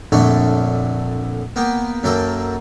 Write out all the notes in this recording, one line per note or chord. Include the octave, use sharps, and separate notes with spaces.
A#1 F2 D3 A3 D4 C#5
A#3 B3 G5
F#2 F#3 A#3 A4 G5